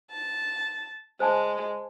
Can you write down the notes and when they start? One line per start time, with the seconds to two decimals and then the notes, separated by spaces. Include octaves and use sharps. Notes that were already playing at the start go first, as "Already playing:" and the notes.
0.12 A5
1.20 G#3 C5 G#5 A5